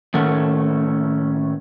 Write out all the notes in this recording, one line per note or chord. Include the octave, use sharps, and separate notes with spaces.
A2 D#3 A3 C#4 F#5